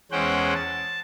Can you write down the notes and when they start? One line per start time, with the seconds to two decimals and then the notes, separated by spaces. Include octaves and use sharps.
0.12 E2 G#3 C#4 C5 F#5 G5
0.55 A5